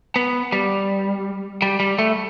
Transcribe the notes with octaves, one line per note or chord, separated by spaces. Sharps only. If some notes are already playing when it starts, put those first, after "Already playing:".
B3
G3
G3
G3
A3